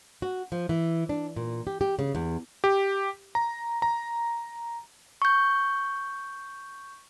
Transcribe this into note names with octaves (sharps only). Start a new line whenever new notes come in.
F#4
F3
E3
D4
A#2
G4
G4
C#3
E2
G4
A#5
A#5
C#6 G6